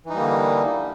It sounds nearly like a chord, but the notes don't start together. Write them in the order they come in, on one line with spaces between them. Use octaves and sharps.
E3 D#4 G3 A#3 D3